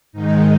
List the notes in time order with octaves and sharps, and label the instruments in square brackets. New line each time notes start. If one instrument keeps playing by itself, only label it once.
[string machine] G#2 D#3 G#3 D#4